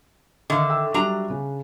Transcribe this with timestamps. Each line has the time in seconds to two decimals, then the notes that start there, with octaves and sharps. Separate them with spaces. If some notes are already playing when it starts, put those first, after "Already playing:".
0.50 D3 D#3 E5 F5
0.69 E5 G5 E6
0.94 F#3 G3 D4 E5 A#5
1.30 C#3